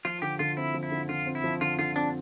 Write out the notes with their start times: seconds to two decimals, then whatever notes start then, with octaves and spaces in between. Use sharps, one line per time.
0.05 F3 F4
0.22 D3 G4
0.39 D3 F4
0.57 C4 E4
0.74 F3
0.83 E4
0.91 D3
1.09 D3 F4
1.26 C4
1.35 E4
1.44 F3
1.61 D3 F4
1.78 D3 F4
1.95 C4 D4